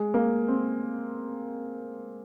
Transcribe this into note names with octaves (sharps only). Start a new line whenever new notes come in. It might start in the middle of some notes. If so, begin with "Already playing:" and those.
Already playing: G#3
A#3
C4